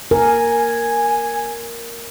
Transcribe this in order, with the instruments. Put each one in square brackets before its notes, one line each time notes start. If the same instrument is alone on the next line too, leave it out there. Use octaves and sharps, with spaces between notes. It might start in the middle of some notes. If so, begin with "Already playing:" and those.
[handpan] A#4 [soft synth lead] G#5